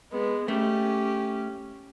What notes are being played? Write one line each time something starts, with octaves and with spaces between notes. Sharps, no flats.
G#3 B3
A3 C#4 G4